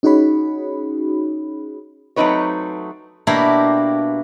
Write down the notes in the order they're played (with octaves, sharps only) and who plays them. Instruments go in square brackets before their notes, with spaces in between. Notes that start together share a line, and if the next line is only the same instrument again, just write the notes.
[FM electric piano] C#4 D#4 F#4 G#4 C#5 B5
[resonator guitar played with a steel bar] F#3 A3 C4 D#4 B4 C#5
[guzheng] B2 A#3 D4 E4 G4